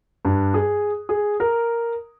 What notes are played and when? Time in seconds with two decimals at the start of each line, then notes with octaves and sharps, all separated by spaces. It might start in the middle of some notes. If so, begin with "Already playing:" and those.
0.25 G2
0.54 G#4
1.09 G#4
1.40 A#4